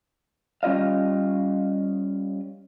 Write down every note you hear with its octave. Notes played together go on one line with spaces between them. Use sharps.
G3 C#4 F4 D#5 F5